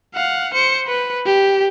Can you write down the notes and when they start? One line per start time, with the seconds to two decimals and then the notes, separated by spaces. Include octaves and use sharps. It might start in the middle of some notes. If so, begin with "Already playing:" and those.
0.15 F5 F#5
0.54 C5 C#7
0.87 B4
1.26 G4